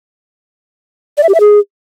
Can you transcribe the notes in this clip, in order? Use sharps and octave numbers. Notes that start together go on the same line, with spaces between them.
D5
E5
G4
E5
G#4